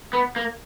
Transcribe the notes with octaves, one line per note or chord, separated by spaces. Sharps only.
B3
A#3